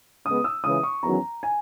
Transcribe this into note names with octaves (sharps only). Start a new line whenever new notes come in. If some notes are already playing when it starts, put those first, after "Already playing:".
C#3 G#3 B3 D#6
E6
C#2 C#3 E3 D#6
C#6
E2 D#3 F#3 C#4 A#5
G#5